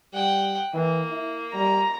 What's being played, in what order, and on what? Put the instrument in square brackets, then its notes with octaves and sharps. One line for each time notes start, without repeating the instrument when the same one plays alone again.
[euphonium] G3 [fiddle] F#5 G5
[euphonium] E3 [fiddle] A#3
[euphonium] E4
[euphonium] G3 [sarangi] A#5